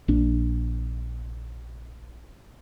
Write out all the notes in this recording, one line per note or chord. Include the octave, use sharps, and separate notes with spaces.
A#1 D4